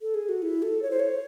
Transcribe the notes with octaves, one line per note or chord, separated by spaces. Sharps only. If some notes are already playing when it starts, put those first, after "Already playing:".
A4
G#4
F#4
E4
A4
C#5
C5
C#5